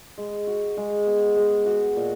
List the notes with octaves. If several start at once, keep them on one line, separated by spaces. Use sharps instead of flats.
G#3
F#4
G#3
B3
G#3
F#4
A#2